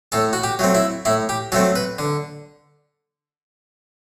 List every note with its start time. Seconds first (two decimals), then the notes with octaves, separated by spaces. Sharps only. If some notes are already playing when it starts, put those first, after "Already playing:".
0.12 A2 A4
0.33 F#4
0.44 G4
0.59 F#3 A3 C4
0.75 E4
1.05 A2 E4
1.29 G4
1.52 F#3 A3 C4 A4
1.76 B4
1.99 D3